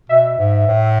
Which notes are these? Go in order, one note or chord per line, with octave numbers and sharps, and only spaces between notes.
B2 E5
G#2
A2